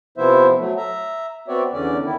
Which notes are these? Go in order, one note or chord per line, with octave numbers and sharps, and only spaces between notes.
C3 F3 B3 E4 C5 E5
F#3 A3
E5 A#5
B3 C4 F#4 C#5 D5 E5
E2 D3 C#4 D5
D#3 E4